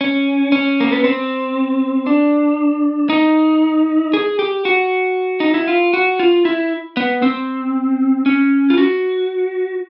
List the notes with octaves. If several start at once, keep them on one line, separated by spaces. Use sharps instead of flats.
C#4
C#4
A#3
B3
C4
D4
D#4
G#4
G4
F#4
D#4
E4
F4
F#4
F4
E4
B3
C4
C#4
F4
F#4